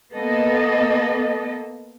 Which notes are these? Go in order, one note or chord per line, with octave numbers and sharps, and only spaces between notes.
A#3 B3 A4 D#5